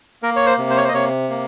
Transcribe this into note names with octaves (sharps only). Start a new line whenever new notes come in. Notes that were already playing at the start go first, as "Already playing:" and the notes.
A#3 A#4
C#5
C5
C3
C5
C#5
C5
D#5
C3 C#5
A#3